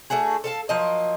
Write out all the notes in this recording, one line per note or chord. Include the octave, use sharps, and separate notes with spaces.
A3 D4 F#4 G#4
A4 F5 A5
F3 F#3 A#3 D#5